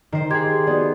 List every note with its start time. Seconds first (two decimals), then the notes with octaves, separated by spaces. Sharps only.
0.12 D#3 C5
0.30 G4 G#4 C6 D6 G#6
0.67 B3 F#4 D5